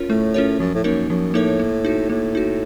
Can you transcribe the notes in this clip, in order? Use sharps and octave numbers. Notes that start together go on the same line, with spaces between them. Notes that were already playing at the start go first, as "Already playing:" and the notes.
Already playing: C#4 F4 A#4 C#5
A2 A3
C#4 F4 A#4 C#5
F#2 F3
A2
F#2 A#3 D#4 A#4 C#5
F#2 F3
A2 A#3 D#4 A#4 C#5
A#3
D#4 F#4
A2 A#3
D#4 F#4